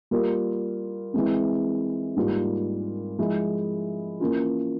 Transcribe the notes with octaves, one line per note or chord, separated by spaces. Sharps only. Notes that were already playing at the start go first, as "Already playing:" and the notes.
G3 A#3 F4 A#4
E3 G#3 C4
G#2 G3 A#3 F4 A#4
F3 G#3 E4
E3 A#3 C#4 F4